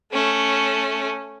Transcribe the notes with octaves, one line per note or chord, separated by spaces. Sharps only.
A3 C#4